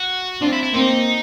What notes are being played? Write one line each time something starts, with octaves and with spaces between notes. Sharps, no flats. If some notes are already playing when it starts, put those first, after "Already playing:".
Already playing: F#4
C4 D4 F4
E4
E4
A#3 C4 D#4